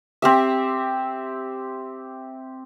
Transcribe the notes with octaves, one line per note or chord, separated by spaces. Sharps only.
C4 G4 E5